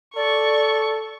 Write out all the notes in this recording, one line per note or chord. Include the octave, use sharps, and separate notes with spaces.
A4 D5 C#6